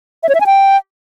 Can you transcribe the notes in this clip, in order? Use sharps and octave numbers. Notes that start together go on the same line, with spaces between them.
E5
C#5
E5
G#5
G5